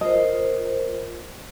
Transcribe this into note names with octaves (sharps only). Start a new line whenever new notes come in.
F4 A#4 C5 D#5